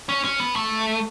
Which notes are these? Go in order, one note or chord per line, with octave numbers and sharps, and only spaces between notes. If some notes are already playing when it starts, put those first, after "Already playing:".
C#4
C#4
B3
A3